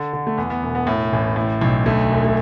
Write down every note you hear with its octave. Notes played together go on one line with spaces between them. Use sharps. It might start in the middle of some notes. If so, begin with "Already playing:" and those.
Already playing: D3 A4
D3
A3
E2 B3
B3
E1
B3
A2
A1
A2
B1
D2 A3
E1
A3